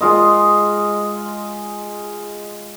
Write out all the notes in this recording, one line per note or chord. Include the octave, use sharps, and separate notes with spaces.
G#3 F4 D#5